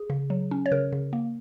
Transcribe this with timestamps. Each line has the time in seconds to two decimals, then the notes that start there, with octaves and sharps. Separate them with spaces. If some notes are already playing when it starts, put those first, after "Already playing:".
Already playing: G#4
0.10 C#3
0.30 F#3
0.51 C#4
0.66 C#5
0.72 C#3 A#4
0.93 C#3
1.13 A#3